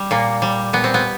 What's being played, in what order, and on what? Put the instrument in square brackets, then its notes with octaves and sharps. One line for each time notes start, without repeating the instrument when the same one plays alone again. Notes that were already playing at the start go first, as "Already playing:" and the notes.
Already playing: [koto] G3
A#2 A#3
G3
A#2 B3
C4
B3